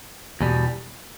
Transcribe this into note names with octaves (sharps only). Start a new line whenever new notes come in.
E2 B2 G3